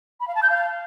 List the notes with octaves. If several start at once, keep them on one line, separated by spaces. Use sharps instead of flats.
B5
F5
A5
G6
F5